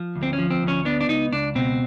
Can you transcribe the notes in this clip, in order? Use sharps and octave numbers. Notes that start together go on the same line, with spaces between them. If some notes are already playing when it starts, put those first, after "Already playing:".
Already playing: F3
D2
C4
C#4
F3
C4
D2
C#4
B3 D4
D4
C#2 D#4
C#2 D4
B2 C4